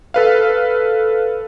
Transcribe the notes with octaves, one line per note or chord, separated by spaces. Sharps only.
A4 B4 F5